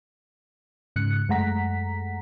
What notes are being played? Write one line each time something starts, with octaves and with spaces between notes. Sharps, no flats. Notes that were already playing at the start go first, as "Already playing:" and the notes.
G#2 C#3 F#6 C#7
F#2 G#3 A3 F#5 A#5 B6